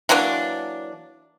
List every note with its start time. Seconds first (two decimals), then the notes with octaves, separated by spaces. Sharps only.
0.09 E3 F#3 A#3 D4